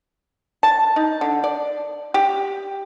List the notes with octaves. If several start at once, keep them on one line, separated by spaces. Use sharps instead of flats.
A5
D#4
D3
D5
G4